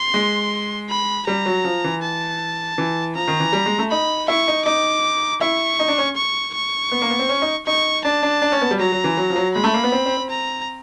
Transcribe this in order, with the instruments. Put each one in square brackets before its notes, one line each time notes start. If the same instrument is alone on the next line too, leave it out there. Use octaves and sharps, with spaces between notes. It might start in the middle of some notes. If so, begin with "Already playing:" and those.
Already playing: [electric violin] C6
[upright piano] G#3
[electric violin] B5
[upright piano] G3 [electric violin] A#5
[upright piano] F#3
F3
E3
[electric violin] A5
[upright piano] E3
[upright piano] F3 [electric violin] A#5
[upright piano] D#3
E3
G3
G#3
A3
[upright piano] D#4 [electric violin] B5
[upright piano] E4 [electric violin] C#6
[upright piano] D#4
[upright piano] D#4 [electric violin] D6
[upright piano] E4 [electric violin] C#6
[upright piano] D#4
D4
C#4
[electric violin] C#6
C#6
[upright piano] B3
A#3
B3
C4
C#4
D#4
[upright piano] D#4 [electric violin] C#6
[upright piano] D4 [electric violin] A5
[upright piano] D4
D4
C#4
B3
G3
[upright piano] F#3 [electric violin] A#5
[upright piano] F#3
E3
F#3
F3
F#3
[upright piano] G#3 [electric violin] B5
[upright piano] A3
A#3
B3
C4
C4
C4
[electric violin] A#5